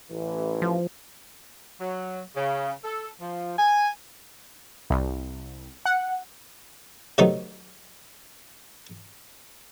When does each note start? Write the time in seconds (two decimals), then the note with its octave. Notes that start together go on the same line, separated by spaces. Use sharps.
0.10 A1 E3
0.62 F3
1.79 F#3
2.35 C#3
2.83 A4
3.20 F3
3.57 G#5
4.90 C2
5.85 F#5
7.18 C3 D#3 F#3 A3 B3 D#4